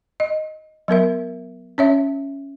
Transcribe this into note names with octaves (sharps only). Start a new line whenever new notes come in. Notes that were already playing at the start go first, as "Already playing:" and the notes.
D#5
F#3 B3 A#4 E5
C#4 C#5 E5